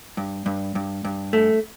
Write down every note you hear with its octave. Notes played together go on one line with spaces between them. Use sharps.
G2
G2
G2
G2
A3